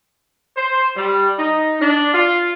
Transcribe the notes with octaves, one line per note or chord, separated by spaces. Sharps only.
C5
G3
D#4
D4
F4